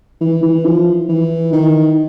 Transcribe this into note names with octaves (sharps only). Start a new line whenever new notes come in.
E3
E3
F3
E3
D#3